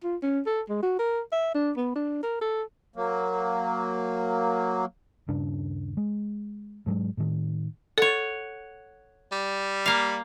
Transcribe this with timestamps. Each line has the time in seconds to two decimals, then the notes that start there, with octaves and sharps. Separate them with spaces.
0.04 F4
0.22 C#4
0.47 A4
0.69 G#3
0.83 F#4
0.99 A#4
1.32 E5
1.54 D4
1.77 B3
1.95 D4
2.23 A#4
2.42 A4
2.96 F#3 A#3
5.28 D#1 G2 C#3 D4
5.97 G#3
6.86 G#2 F#3 G#3
7.17 A2 D#3
7.98 A4 C#5 F#5
9.32 G3
9.86 A#3 F5